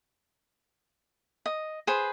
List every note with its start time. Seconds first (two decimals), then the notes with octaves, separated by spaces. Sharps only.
1.46 D#5
1.87 G#4 B4 C5